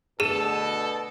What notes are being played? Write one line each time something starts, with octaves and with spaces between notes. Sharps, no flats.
D2 B2 G#4 A4 E7